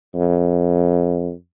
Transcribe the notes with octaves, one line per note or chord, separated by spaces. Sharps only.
F2